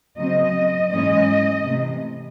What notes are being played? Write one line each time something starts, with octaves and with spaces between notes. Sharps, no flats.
C#3 F#3 C4 D#5
G#2 E3 G#3 C#4 D#5
C3 E3 A3